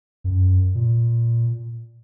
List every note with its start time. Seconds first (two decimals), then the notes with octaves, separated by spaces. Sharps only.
0.24 F#2
0.75 A#2